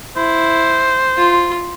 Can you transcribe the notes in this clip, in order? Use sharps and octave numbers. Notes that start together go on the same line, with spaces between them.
E4 C5
F4